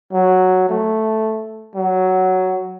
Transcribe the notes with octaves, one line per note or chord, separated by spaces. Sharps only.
F#3
A3
F#3